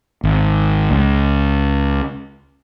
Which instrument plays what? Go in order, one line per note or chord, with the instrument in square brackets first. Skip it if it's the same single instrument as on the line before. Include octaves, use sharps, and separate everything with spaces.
[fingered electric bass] G#1
C#2